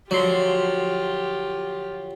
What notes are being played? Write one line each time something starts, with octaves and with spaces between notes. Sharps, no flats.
D3 F3 F#3 F4 G4 C6